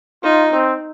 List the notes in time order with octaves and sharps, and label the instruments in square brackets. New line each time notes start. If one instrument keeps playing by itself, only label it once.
[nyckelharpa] D#4 [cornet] F4
[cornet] C4